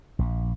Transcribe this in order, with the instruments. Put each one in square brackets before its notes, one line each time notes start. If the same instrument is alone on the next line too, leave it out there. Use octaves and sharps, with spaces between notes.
[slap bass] A#1